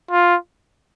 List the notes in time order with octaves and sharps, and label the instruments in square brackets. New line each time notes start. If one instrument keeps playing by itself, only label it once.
[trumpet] F4